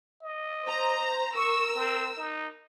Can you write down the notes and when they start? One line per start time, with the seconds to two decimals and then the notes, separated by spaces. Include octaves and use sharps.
0.23 D#5
0.65 C5 A#5
1.35 A#4 C#6 E6
1.76 C4
2.17 D#4